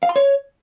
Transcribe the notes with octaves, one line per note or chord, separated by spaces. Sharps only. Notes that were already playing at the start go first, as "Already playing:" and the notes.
F5
C6
C#5